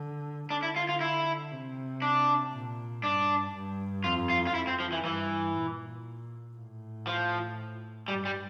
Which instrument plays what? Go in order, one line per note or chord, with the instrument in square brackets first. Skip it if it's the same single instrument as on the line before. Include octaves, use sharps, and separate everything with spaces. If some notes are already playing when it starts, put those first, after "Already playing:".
Already playing: [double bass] D3
[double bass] D3 [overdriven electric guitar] D4
[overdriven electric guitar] E4
F4
F4
E4
[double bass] C3
[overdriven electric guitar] D4
[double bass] A#2
[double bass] G2 [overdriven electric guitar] D4
[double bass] G2
[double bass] F2 [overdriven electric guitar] F4
[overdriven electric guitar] F4
F4
[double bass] F2 [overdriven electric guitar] E4
[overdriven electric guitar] C4
F3
E3
[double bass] G2 [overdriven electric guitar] E3
[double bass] A#2
A2
[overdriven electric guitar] F3
[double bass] G2 [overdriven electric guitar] G3
[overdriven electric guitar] G3